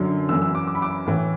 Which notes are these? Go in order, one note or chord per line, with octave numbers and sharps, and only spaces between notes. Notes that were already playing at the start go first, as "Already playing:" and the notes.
Already playing: F#2 D3 F#3
F#2 E3 E6
E6
D6
D6
B5
D6
A2 E3